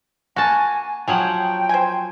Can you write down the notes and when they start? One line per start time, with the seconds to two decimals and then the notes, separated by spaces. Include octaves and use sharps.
0.36 A#3 F#4 G#5 A5
1.08 F3 F#3 G#4 F#5 G5
1.69 C5 G#5